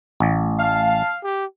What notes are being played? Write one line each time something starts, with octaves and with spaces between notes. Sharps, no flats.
A1
F5 A5
G4